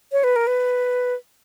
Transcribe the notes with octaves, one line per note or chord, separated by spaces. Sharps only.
C#5
B4
A#4
B4